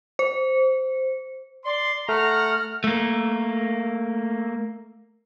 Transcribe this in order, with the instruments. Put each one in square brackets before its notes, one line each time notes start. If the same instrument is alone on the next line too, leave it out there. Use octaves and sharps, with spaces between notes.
[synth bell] C5
[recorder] D5 [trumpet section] C6
[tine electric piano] A3 [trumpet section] F#5 A#5 [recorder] F6
[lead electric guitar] A3 A#3